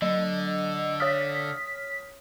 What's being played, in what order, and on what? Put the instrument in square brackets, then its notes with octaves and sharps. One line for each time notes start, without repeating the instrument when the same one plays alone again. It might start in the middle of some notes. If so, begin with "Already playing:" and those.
[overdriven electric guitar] D3 [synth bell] F#3 [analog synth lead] D#5
[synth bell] C#5 D#6 F6 [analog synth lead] B6